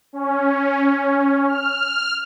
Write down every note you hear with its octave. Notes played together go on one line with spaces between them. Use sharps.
C#4
F6